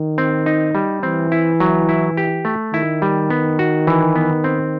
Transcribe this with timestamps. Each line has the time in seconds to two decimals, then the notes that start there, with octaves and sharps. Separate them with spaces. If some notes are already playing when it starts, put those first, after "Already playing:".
Already playing: D#3
0.18 C4
0.46 D#4
0.75 G3
1.03 E3 C4
1.32 E4
1.60 F#3
1.89 E4
2.17 G4
2.45 A3
2.73 D#3 E4
3.02 G3
3.30 B3
3.59 F#4
3.87 E3
4.16 B3
4.44 C4